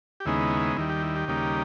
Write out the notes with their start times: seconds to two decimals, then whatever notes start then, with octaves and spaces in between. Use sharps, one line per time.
0.20 G4
0.25 D#2 C#3 G#3 B3 D#4 E4
0.77 D#2 D#3 G3 E4
0.89 G4
1.02 E4
1.16 G4
1.28 D#2 C#3 G3 A#3 D#4